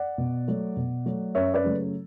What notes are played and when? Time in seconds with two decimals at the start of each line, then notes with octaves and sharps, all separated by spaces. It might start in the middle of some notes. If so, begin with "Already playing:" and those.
Already playing: D5 F#5
0.18 B2
0.47 F#3 A3
0.77 B2
1.06 F#3 A3
1.35 F#2 C#5 E5
1.54 B4 D5
1.64 C#3 F#3 A3